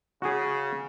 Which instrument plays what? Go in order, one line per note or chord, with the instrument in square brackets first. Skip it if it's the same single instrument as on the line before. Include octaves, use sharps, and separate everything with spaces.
[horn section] C#3 [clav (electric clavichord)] F#4 G#4